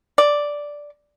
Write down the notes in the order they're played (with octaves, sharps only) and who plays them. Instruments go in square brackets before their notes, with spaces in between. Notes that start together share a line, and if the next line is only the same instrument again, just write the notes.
[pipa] D5